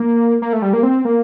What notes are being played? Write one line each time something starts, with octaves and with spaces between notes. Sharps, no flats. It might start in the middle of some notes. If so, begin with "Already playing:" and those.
Already playing: A#3
A#3
A3
G3
A#3
C4
A#3